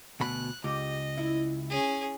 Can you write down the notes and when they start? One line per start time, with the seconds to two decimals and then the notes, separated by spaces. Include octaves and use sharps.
0.20 D2 B2 B5 F#6
0.64 C#2 G4 D#5
1.17 E4
1.70 C#4 G#4